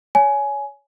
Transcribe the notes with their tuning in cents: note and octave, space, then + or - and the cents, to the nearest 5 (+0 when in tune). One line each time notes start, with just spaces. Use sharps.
C#5 +25 G#5 +15